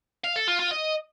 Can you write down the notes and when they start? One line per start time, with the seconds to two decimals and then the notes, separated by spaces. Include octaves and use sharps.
0.24 F5
0.36 A4
0.48 F4
0.59 F4
0.71 D#5